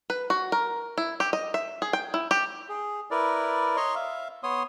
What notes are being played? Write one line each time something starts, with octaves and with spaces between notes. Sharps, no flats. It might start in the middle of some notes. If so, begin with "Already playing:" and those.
B4
F#4
A#4
E4
G4
D#5
E5
G#4
G5
E4
G4
G#4
E4 A#4 B4 D5
C#5 D#5 A#5 C6 C#6
E5 F5
B3 C#5 C6 D#6